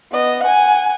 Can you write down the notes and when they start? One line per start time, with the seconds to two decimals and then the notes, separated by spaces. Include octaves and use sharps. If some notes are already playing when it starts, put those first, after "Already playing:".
0.11 B3 D#5
0.43 F#5 G#5